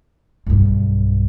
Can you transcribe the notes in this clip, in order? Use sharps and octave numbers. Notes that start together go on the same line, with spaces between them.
B1 G2